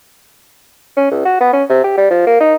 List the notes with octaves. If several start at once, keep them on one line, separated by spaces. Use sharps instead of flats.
C#4
C#2
F#4
B3
C#4
C3
G4
G3
F3
A#3
D#4